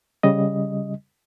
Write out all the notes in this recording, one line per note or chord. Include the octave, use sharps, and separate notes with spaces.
C#3 G3 D#5